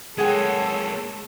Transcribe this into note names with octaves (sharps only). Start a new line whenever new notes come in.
G#3 A#3 G#4 A4 C#5 F#5 G5